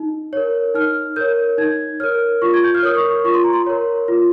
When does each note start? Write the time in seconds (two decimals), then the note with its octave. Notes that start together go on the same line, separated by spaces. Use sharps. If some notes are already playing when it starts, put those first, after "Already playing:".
Already playing: D#4
0.33 A#4 C#5
0.74 D#4 F6
1.16 A#4 C#5 G6
1.58 D#4 G#6
2.00 A#4 C#5 F6
2.42 F4 C#6
2.54 G#6
2.64 G6
2.75 F6
2.83 A#4 C#5 D#6
2.96 C#6
3.25 F4 C#6
3.34 C6
3.44 A#5
3.53 C6
3.67 A#4 C#5
4.08 F4